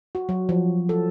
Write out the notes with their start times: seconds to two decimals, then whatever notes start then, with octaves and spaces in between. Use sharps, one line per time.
0.15 F#4
0.29 F#3
0.49 F3
0.89 A4